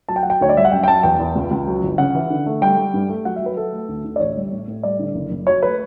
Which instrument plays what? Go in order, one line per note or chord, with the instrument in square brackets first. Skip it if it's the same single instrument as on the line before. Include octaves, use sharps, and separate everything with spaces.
[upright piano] F#3 A5
G5
F#3 F#5
G5
D2 C#5
D5
G3 E5
F#5
F#2 G5
G5
F#2 A5
E2 G5
E2
C#2
C#2
F#3
G1
C#3 F#5
E3
D3
A3
G3 G5
G3
G2
A3
F#3 F#5
E5
F#3 B4
F#3 A4
A3
D2
D3
D5
A1 C#5
G3
A2
A2
G3 D5
D3
F#1
F#1
F#3 C#5
A3 B4